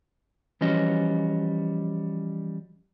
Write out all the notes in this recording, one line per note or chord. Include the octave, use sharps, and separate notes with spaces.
E3 F3 G3 C#4 F#4 D#5